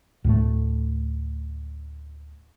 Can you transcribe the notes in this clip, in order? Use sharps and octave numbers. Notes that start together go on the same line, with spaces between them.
D2 A2 A3